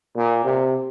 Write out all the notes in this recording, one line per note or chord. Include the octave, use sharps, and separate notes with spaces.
A#2
C3